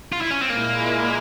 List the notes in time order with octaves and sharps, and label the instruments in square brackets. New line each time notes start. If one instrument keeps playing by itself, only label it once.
[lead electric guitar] F4
E4
C#4
C4
[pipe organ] A#2 G#3 E4 [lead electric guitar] A#3